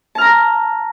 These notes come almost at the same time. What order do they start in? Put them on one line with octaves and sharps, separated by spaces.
A5 F6 A#5